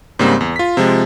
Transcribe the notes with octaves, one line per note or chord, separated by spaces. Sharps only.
G#2 C#3 G3 A#3 C4
E2
F4 B6
C3 F3 G#3